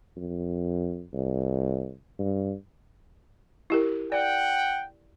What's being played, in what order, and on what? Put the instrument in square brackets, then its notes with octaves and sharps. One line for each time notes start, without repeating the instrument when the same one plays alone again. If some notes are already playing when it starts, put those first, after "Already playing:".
[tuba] F2
C2
G2
[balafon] E4 G4 A#4
[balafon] D5 [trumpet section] F#5 G5